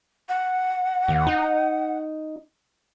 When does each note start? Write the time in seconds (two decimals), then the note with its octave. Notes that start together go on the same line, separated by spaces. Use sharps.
0.29 F#5
1.08 D#2
1.27 D#4